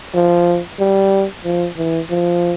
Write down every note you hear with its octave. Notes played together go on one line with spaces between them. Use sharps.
F3
G3
F3
E3
F3